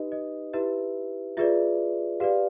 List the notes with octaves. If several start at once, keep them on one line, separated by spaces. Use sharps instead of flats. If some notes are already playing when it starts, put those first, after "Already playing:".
Already playing: D#4 G4 B4 D#5
D#5
E4 G4 B4 E5
F4 G#4 B4 D5 E5
G4 B4 D5 F5